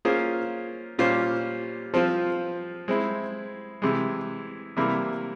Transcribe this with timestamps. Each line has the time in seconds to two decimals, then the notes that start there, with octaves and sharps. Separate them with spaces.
0.05 A#3 C#4 F4 G#4 C5
0.99 A#2 G3 C#4 F4 C5
1.94 F3 C4 F4
2.88 G#3 C4 E4
3.82 C3 E3 G#3
4.77 C3 E3 G3 A#3 E4